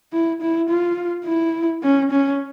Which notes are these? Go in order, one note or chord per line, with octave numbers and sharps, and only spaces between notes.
E4
E4
F4
E4
C#4
C#4